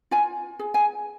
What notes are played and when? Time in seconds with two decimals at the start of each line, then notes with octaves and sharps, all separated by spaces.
0.11 F4 G#5
0.59 G#4
0.74 G#5